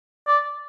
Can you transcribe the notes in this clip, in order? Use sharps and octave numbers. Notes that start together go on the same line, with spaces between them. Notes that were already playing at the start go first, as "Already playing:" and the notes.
D5